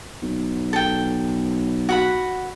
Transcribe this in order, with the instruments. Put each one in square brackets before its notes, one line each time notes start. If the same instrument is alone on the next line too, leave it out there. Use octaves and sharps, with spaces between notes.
[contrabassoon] B1
[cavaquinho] A4 G5
F#4 F#5 B5